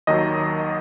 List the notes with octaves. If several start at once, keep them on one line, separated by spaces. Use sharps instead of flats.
D#2 D#3 F#3 D#5